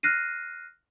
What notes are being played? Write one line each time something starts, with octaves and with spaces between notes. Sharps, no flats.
F6 F#6 A#6 C7 D#7